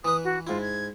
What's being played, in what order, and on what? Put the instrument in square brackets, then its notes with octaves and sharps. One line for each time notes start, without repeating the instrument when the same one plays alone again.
[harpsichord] E3 B4 [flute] D#6
[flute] F#4
[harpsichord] G#2 E4 [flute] F4
[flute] G#6